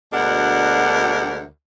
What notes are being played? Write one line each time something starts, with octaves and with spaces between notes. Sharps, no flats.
D2 B2 G#3 D4 A#4 F#5